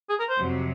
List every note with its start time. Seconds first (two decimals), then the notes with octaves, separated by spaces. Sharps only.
0.09 G#4
0.19 A#4
0.29 C5
0.39 F2 C3 F#3